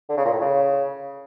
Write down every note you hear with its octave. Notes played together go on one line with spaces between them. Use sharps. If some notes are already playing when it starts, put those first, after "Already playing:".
D3
C#3
A#2
A2
C#3